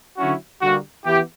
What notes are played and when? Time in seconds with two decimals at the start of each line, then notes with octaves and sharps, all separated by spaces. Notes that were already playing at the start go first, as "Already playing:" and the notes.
0.18 D3 F#3 C#4 E4 F#4
0.62 D3 G3 A#3 F#4
1.06 E3 B3 E4 G4